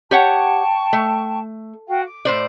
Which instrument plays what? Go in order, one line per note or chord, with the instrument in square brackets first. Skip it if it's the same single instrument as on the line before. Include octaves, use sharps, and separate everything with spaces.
[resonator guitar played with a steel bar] G4 C#5 F#5 [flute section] G5 A5 C#6
[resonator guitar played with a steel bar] A3
[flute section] F#4 F5 G5
D6
[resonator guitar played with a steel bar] A2 C5 D5